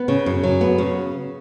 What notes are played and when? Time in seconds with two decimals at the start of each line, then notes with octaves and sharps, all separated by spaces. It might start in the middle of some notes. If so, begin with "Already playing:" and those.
Already playing: B3
0.08 C#3
0.26 F#2
0.43 F#3
0.61 B3
0.78 C#3